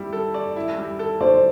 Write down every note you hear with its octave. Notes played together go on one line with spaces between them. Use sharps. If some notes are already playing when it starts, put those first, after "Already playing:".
Already playing: G3 E4
A4
D5
E4
G3
A4
C5 D5